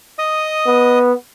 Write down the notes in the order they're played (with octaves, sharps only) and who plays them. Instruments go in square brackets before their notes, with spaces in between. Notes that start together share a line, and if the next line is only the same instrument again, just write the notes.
[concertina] D#5 D#6
[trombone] B3